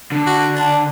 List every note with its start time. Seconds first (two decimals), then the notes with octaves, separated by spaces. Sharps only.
0.12 D3
0.26 F#4
0.55 D4